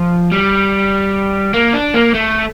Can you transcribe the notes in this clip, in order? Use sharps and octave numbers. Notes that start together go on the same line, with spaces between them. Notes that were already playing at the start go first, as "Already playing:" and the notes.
Already playing: F3
G3
A#3
D4
A#3
A3